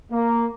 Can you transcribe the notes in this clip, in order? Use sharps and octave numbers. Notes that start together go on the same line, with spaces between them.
A#3